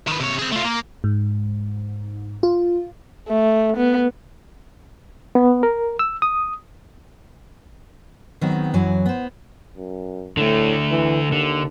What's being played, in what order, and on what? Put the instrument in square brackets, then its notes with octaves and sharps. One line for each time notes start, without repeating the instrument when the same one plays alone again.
[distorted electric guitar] D#3 B4
C3 C#5
C4 G#4
A3 F4
A#3
[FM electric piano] G#2
F4
[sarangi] A3
B3
[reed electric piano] B3
A#4
E6
D#6
[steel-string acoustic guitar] D#3 F#3 G#3 B3 C4
F#2 E3 F#3 G#5
B3 C5
[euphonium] F#2
[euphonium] A2 [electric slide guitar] D3 A3
[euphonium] E3
[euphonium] D#2 [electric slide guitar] D3